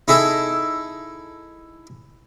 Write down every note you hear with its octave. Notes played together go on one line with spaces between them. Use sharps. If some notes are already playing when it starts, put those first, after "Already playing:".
D#4 E4 G#4 A4